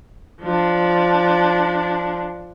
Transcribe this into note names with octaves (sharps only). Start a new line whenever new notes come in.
F3 D4